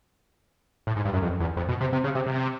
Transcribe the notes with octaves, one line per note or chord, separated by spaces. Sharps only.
A2
G#2
G2
F#2
F2
E2
F2
B2
C3
C3
C#3
C3
C3